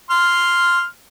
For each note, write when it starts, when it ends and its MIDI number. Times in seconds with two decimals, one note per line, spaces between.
0.10 0.85 84
0.10 0.85 89